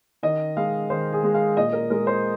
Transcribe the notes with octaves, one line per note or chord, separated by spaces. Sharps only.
D#3 D#5
G#3 F5
D#3 C5
G#4
G#3
F5
A#2 D#5
A#4
G#3 A#4
C5